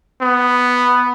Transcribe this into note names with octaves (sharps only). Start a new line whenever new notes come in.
B3